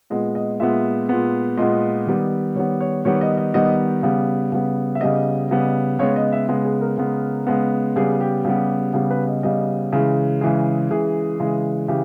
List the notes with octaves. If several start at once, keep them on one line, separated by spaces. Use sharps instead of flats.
A#2 G#3 B3 D#5
D#5
A#2 G#3 B3 E5
A#2 G#3 B3
A#2 G#3 B3 D#5
D#3 G3 B3
D#3 G3 B3 C#5
C#5
D#3 G3 B3 C#5
D#5
D#5
D#3 G3 B3 D#5
C#3 G3 B3
C#3 G3 B3
E5
C#3 G3 B3 D#5
C#3 G3 B3
C#3 G#3 B3 C#5
D#5
E5
C#3 G#3 B3 G#4
G#4
A#4
C#3 G#3 B3
C#3 G#3 B3
C#3 G3 B3 G#4
G4
C#3 G3 B3
C#3 G3 B3 G#4
B4
D#5
C#3 G3 B3 D#5
C#3 E3 G#3
C#3 E3 G#3 G#4
C#3 E3 G#3 G#4
C#3 E3 G#3
C#3 E3 G4